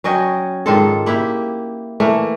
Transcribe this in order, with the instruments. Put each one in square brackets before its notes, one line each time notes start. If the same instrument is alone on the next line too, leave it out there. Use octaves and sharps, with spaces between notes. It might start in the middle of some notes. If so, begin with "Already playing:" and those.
[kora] F#3 C#4 D#5 G5
G#2 D#3 F4 A4
A#3 E4 G4
E3 A3 A#3